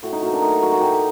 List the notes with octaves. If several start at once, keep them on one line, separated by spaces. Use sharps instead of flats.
A2 F#4
D#4
F#3 A#3 F#4
D4
A2 D#4
F#3 A#3 F#4
F#4
A2 G4